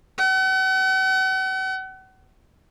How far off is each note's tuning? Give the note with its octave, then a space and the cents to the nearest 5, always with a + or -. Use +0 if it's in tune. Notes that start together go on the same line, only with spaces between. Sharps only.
F#5 +40